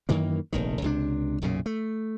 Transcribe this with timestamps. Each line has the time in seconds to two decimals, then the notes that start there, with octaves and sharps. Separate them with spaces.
0.09 F#2 D#3 E3 A#3
0.53 F1 A#1 D#3
0.82 C#2 C3 D4
1.42 B1 F#2 A#2 C#3
1.66 A3